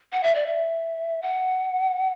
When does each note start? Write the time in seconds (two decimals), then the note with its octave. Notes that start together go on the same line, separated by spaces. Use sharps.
0.12 F#5
0.23 E5
0.35 D5
0.46 E5
1.22 F#5